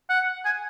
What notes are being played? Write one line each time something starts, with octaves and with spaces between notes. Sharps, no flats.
F#5
G#5